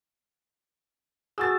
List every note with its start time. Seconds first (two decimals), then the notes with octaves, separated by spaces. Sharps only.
1.38 F#4 G#4 E6 A6